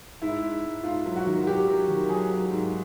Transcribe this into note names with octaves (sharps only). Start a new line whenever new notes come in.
G#2 E4
G#2
G#2
G#2 F4
F#3
F#4
D#3
F#3 G4
F#3
D#3
F#3 G#4
F#3
G#2